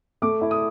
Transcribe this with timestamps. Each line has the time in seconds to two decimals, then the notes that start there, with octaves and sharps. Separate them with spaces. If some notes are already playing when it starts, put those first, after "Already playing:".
0.22 A3 D6
0.41 E4
0.51 D#6